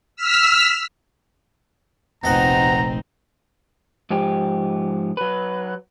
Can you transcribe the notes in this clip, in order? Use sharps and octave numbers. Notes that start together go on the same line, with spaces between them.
E6 F6 B6
F1 A#1 B2 C4 D#4 D#5 F#5 A#5
G#2 F3 G4
F#3 B4